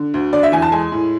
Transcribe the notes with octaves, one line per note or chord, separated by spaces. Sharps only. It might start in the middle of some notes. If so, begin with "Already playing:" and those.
Already playing: D3
D2
D3 D5
E5
E2 G#5
A5
G#3 G#5
A2